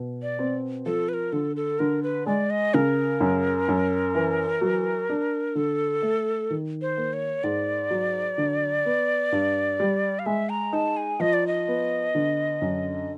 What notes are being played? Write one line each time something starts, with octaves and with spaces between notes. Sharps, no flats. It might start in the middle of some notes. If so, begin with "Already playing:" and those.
Already playing: B2
D5
C4
F3 A4
B4
A#4
D3 A4
A4
D3 A#4
B4
G#3 D5
D#5
C#3 A#4
F#2
F#2
E3
F#3
D4
D3 A4
A3
D#3
C5
A#3
C#5
G#2 D5
F#3
D3
B3
G2
G3
F5
G#3 E5
A#5
D#4 A5
G#5
F3 D#5
D5
D#5
B3
D3
F#2